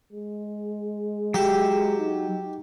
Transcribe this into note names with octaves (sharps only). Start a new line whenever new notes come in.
G#3
F#3 G4 E5
D#4